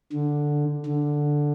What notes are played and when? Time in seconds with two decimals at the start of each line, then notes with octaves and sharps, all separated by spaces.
0.13 D3
0.86 D3